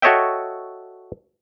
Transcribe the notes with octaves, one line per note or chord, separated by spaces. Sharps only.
F#4 A4 C#5 D#5 E5 G5